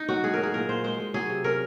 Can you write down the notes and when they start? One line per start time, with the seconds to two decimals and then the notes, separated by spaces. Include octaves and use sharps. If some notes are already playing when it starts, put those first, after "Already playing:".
Already playing: D#4
0.09 F#3 F#4
0.24 G#2 G#4
0.34 A#4
0.39 F#3 G#4
0.53 A#2 A#4
0.69 A#2 C5
0.84 G#3 C5
1.00 G#3
1.14 F#3 G#4
1.30 C3
1.44 C#4 A#4